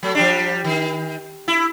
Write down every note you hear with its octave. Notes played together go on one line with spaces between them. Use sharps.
F#3 A3
F3 G3 D4
D#3
E4